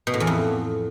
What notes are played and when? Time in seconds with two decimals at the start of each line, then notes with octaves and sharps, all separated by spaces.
0.07 B2
0.14 A2
0.20 E2
0.27 F2